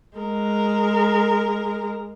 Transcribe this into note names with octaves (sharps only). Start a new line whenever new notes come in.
G#3 A#4